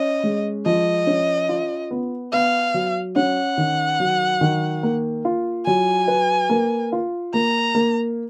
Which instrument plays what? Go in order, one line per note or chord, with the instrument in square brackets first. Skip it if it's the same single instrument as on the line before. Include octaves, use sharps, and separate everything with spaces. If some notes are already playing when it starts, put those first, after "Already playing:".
Already playing: [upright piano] C#4 [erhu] D#5
[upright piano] G#3
[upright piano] F3 [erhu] D#5
[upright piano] C#4
F4
B3
[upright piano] B3 [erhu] F5
[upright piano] F#3
[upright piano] C#4 [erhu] F#5
[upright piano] D#3
F#3
D#3
A#3
F4
[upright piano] F#3 [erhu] G#5
[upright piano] B4
A#3
F4
[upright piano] A#3 [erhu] A#5
[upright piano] A#3